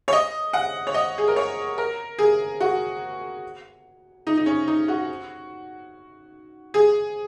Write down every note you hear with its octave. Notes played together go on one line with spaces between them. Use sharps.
C#5
D#5
F#5
C#5
D#5
G#4
A#4
C#5
A#4
G#4
F#4
D#4
D#4
C#4
D#4
F#4
G#4